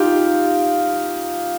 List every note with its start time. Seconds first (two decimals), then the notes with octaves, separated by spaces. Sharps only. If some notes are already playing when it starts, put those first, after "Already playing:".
Already playing: D#4 F4 G4